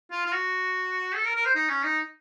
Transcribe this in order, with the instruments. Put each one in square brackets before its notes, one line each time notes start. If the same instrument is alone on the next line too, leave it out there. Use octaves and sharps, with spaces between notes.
[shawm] F4
F4
F#4
A4
A#4
A#4
C5
D#4
C#4
D#4